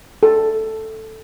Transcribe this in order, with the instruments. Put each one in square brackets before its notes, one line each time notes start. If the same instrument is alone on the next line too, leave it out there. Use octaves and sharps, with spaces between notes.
[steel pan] A4